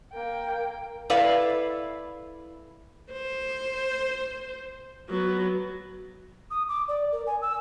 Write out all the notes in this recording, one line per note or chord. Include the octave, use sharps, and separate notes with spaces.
A#3 G5
E4 A4 B4 D5 E5 F5
C5
F#3 B3
D#6
D6
D5
A#4
G#5
E6